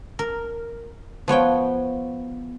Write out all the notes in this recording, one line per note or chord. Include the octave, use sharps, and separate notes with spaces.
A#4
F3 B3 C#5 G5